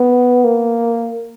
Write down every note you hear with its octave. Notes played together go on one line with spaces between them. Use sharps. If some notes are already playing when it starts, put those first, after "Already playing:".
Already playing: B3
A#3